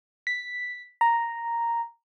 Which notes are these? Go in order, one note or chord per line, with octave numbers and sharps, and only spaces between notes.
B6
A#5